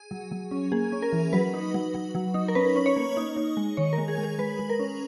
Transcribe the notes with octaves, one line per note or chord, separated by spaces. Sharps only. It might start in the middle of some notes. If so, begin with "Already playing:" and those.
Already playing: G#4
F#3
F#3
C#4
A#3 G#4
C#4
A#4
E3
F#3 B4
D#4
F#3
F#3
F#3
D#4
A#4
C#4 B4
C#4
C#5
A#3
D#4
D#4
G#3
D#3 C#5
A#4
G#3
G#4
G#3
G#4
G#3 B4
G#3
A#4
C#4